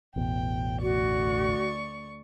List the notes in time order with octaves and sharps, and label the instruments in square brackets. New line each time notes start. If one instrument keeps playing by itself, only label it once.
[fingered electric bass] A1 E2 B2 [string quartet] G5
[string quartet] D2 D5 C#6 [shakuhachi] F#4